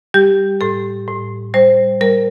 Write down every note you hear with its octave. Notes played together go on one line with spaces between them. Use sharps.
G3 G4
A2 A4
A2
G3 C5
G3 A#4